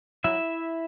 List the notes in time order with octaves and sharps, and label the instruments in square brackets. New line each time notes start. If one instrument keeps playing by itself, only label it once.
[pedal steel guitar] F#3 E4 E5